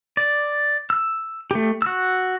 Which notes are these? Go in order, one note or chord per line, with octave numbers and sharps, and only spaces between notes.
D5
E6
A3 G4
F#4 E6